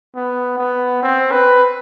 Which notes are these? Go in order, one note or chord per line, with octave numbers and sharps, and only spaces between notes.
B3
B3
C4
B4